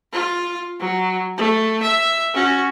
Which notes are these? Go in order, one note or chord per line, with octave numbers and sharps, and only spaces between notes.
F4
F#3
A3
E5
C#4 F#4